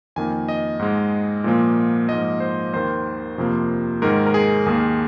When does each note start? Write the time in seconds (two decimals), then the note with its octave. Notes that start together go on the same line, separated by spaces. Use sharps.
0.16 F2 D#3 A#3 G#5
0.48 D#5
0.79 G#2 G#3
1.44 A#2 F3 A#3
2.09 G#2 F3 A#3 D#5
2.40 C5
2.74 D#2 D#3 A#3 C5
3.38 F2 C3 F3 A#3
4.02 G#2 D#3 G#3 A#4
4.26 A#4
4.34 G#4
4.66 D#2 D#3 A#3 G#4